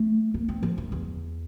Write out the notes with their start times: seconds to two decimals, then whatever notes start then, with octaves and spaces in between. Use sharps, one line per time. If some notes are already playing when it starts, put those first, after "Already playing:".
Already playing: A3
0.34 A#3
0.48 C4
0.63 F3
0.78 G2
0.92 E2